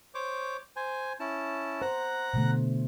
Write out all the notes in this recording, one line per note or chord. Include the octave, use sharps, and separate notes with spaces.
C5 C#5 D6
C5 G#5
C#4 E4 A5
C5 F#5 A#5 F#6
B2 D3 A3